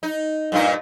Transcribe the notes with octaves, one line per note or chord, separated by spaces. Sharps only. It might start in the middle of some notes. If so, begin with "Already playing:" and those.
D#4
G2 A#2 D#4